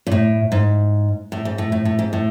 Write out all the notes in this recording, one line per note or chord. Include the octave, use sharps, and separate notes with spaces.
A#2
A2
G#2
A2
G#2
A2
A2
A2
G#2
A2